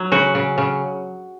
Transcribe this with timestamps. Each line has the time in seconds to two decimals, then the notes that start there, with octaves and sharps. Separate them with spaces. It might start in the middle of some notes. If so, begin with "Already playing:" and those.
Already playing: F#3
0.12 C#3 F#4
0.35 C#3
0.58 C#3